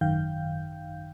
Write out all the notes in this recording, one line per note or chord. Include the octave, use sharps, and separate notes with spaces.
G#1 F#2 D#3 F5 G5 G6